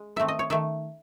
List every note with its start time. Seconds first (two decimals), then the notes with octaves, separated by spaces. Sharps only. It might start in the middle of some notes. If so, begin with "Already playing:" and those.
Already playing: G#3
0.16 D#3 A3 C4 E5
0.28 D#5
0.39 C#5
0.50 D#3 A3 E5